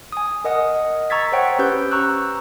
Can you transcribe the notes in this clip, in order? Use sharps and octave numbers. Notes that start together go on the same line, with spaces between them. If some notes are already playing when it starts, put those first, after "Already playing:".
G#5 D#6
A#4 D#5 F#5 D#6
A#5 C#6 E6 G#6 A6 B6
C5 C#5 F#5 G5
C#4 G4 B4 E6 G6
A#5 C#6 E6 F#6